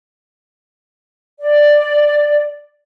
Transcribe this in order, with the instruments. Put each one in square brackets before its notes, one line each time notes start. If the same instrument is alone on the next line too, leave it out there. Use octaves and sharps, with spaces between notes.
[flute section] D5